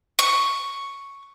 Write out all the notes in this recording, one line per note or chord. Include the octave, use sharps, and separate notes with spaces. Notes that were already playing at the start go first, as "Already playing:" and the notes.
C#6